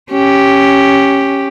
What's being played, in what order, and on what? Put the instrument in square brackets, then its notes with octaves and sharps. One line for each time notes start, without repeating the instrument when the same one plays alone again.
[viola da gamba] C#4 G4